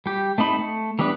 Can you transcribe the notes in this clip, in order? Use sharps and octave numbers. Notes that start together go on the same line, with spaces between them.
G3 G4
A3 C4 D#4 B5
A3
E3 G3 B3 D4 B4